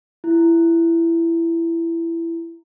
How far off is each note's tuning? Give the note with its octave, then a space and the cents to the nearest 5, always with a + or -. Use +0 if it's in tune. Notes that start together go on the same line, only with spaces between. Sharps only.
E4 +15